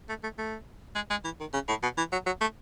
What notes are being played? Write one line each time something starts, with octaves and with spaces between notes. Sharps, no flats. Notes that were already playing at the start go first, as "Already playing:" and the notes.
A3
A3
A3
G#3
G#3
E3
D#3
C#3
A2
B2
E3
F#3
F#3
A3